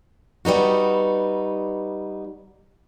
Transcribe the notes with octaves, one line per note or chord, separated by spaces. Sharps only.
G3 B3 D#4 F#4